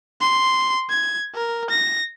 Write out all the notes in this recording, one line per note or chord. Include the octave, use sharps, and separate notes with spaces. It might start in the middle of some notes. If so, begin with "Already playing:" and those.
C6
G#6
A#4
A#6